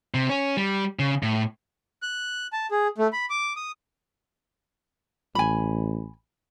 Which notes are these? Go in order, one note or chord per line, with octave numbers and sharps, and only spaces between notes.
C3
C#4
G3
C#3
A2
F#6
A5
G#4
A3
B5
D6
D#6
A1 G#5 B5